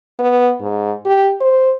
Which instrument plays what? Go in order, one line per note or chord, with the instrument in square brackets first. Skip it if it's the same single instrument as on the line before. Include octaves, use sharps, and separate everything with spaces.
[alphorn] B3
G#2
G4
C5